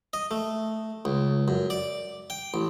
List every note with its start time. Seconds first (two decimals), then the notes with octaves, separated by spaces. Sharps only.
0.13 D#5
0.31 A3
1.05 C#2
1.48 F#2
1.70 D5
2.30 G5
2.54 A1